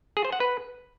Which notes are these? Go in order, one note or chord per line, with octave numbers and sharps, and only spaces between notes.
G#4
C5
F#5
B4